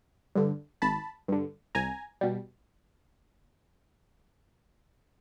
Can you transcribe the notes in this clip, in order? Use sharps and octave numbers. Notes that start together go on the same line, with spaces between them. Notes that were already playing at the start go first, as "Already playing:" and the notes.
G2 D3
G#1 A5 B5
G2 D3
C2 G#5 A#5
B2 G3